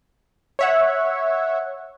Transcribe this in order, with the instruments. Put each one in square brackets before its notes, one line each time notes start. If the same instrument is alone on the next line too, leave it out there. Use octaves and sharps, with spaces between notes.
[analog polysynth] C#5 E5 F#5